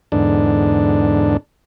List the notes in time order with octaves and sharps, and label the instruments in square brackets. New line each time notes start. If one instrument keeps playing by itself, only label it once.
[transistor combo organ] E2 G#2 D3 D4